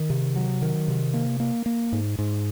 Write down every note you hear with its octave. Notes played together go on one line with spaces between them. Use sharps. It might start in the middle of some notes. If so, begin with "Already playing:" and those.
Already playing: D#3
C3
F#3
D#3
C3
A#3
A#3
A#3
G#2
G#2